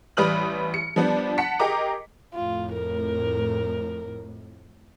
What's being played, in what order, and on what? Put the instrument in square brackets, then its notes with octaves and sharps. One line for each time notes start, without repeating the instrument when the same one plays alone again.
[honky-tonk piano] A1 G3 B4 D#6 F6 F#7
C#7
F3 G3 B3 D4
F#5 A5 B6 C#7
G4 G#4 A#4 D#5 A#5 D6
[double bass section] F2 A2 [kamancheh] F4
[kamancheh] A#4